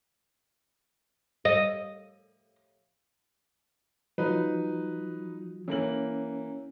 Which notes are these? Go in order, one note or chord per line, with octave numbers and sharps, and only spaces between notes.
D#5
F3 F#3 D#4 B4
E3 A#3 C#4 F#7